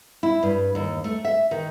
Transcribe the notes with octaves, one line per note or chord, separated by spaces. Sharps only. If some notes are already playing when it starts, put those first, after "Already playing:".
E4
G2
D#2
A3
E5
D#3